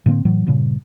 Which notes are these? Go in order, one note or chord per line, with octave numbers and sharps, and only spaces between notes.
A2 D3 A#3 C4
A2 E3 F#3
G2 A#2 C#3